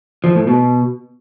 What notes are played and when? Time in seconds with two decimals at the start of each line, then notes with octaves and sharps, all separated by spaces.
0.24 F3
0.35 A2
0.47 B2